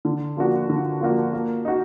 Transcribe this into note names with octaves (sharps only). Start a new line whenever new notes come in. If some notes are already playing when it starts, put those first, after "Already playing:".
D3
F3 A#3 D4 F#4
D3
F3 A#3 D4 F#4
A#3
D#4 F#4